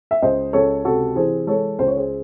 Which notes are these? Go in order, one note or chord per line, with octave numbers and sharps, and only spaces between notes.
E5
C#2 C5 D#5
C#2 A4 C#5
C3 F#4 A4
E3 G#4 C5
G#3 A4 C#5
C#2 C5
C#5
G#4 C5